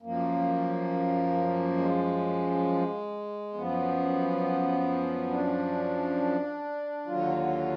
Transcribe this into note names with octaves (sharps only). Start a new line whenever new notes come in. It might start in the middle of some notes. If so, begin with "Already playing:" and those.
F#2 F3 A#3
G#3
F#2 F3 B3
D4
D#2 D3 F#3 F4